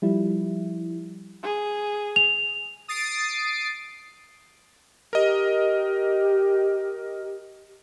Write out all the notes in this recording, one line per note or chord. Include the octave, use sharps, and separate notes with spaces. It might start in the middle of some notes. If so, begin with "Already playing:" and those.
F3 G3 E4
G#4
F7
D#6 A6 C7 D7
G4 A#4 D#5